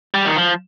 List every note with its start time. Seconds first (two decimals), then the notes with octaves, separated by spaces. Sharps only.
0.14 G3
0.26 D#3
0.36 F3